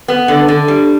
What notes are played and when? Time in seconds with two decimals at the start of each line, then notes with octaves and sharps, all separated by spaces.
0.08 B3
0.28 D3
0.48 D3
0.68 G3